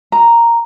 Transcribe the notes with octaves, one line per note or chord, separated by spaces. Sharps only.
A#5